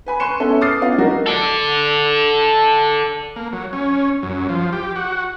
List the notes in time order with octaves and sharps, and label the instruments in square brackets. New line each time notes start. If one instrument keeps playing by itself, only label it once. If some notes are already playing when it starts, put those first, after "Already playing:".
[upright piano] B4 G#5 B5
G#5 C6 C#6 F#6 C#7 E7
B3 C#4 A4 E5
D6 D#6 F6 A6 C7
B3 C#4 F4 F5
F#3 F#4 G4 A#4 D#5 F#5
[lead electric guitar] A4 D5
[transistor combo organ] A#3
F#3
C#4
F#2
F3
G4
F#4